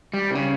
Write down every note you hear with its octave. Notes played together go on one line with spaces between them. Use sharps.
G3
C3
C#3